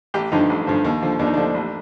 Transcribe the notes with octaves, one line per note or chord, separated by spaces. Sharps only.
A1 G4
G2 D3 F3 D#4
A1
G2 D3 F3
D#2
D3 F3
D#2 D4
D#4
D3 F3 D4
A1